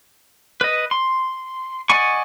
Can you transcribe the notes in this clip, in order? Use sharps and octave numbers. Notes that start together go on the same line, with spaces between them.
B4 D#5
C6
D5 D#5 F#5 G#5 C#6